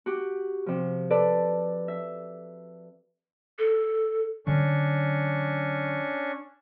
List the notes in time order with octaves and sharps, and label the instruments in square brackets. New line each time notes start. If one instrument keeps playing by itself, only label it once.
[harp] F#4 G4
C3 F3
A4 B4 D5
E5
[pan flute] A4
[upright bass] D3 F#3 [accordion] C#4 D4 C#6